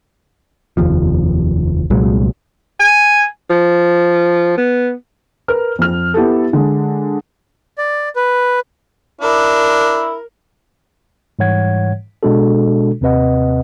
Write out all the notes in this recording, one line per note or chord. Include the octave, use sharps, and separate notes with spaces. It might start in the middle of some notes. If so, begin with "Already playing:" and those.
F1 D#2 F3
C2 A#2 F#3 G#3
G#5
F3
B3
A#4 B4 F6
F2 F6
B3 E4 G4 A4
D3 G#3
D5
B4
D4 E4 A#4
G#2 E3 G3 C#5 F#5 G#6
B2 G#3 D4 F#4 A4
D#2 C3 C4 B4 D#5 F#5